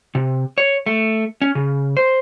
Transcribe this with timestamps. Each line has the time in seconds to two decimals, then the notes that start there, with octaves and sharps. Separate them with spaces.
0.15 C3
0.58 C#5
0.86 A3
1.42 C#4
1.55 C#3
1.97 C5